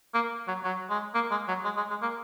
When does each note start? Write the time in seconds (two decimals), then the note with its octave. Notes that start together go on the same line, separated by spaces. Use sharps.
0.14 A#3
0.48 F#3
0.64 F#3
0.90 G#3
1.14 A#3
1.31 G#3
1.48 F#3
1.65 G#3
1.77 G#3
1.90 G#3
2.02 A#3